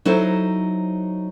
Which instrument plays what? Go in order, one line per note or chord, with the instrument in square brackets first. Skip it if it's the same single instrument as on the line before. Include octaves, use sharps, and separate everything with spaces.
[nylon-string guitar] F#3 D#4 E4 A4 C5